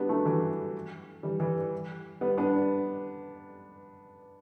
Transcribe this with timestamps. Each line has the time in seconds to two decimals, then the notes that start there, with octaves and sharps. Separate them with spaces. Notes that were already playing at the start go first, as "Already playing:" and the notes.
Already playing: G3 B3 D4 F#4
0.09 F#3 A3
0.25 E3 G3
1.23 E3 G3
1.40 E3 G3
2.21 G3 B3
2.38 B3 D4